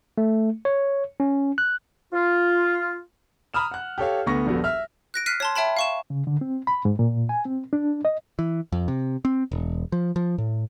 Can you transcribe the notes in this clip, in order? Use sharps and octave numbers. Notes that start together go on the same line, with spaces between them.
A3
C#5
C#4
F#6
F4
A#5 B5 D#6 F6 E7
F#5 F#6
G4 A4 C#5 F5
D2 D3 B3 C#6 A#6
D#1 A#1 B3 F#4 A4
E5 F6
F#6 A#6 D7
F6 F#6 B6 C7 D#7
C#5 A5 C6
C#5 E5 G5 A5 B5
F5 C#6 E7
C#3
D3
C4
B5
G#2
A#2
G#5
C4
D4
D#5
E3
F2
C3
C4
E1
F3
F3
A2